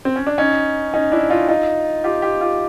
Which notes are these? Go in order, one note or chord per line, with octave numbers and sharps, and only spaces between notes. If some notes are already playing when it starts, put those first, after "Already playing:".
C4
C#4
D4
C#4 D#4
C#4 D#4
D4 E4
D#4 F4
D#4 F4
F4 G4
F4 G4
F4 G4